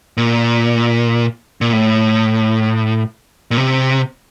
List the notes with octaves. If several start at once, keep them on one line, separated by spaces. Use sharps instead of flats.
A#2
A#2
A2
A#2
C3